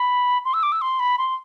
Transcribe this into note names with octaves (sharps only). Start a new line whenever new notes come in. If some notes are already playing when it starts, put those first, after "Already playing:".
Already playing: B5
C6
E6
D6
E6
C6
B5
C6